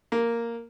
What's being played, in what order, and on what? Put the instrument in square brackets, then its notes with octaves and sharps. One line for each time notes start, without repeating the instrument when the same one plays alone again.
[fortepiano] A#3